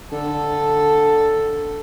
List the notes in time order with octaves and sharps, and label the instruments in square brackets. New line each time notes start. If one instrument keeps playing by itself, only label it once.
[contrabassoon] D3 [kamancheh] A4